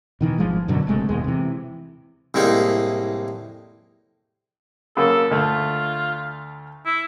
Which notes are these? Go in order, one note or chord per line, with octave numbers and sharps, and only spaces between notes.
B2 D#3 E3
G#1 F3 G#3
F#2 B2 D3 F#3
F#1 C3 G#3 A3
D#2 B2 G#3
C3 E3
C2 A2 G#3 A#3 D#4
C#3 F#3 A#3 A4
D2 A3 F4
E4